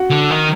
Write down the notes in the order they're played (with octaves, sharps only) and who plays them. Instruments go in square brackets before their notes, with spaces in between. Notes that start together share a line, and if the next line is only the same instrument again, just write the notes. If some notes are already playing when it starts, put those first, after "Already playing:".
Already playing: [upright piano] F#4 F#5
[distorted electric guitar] D3
D#3